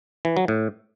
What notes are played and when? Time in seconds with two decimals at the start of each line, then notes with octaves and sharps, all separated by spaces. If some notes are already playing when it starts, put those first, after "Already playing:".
0.25 E3
0.37 F#3
0.48 A2